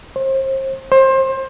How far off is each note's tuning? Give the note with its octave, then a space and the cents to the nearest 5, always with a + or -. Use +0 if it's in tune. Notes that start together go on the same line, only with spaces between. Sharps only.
C5 +35
C5 +25